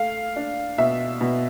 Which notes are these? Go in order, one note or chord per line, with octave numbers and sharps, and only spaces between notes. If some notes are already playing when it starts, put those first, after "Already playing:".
Already playing: A3 F5
D4
B2 E5
B2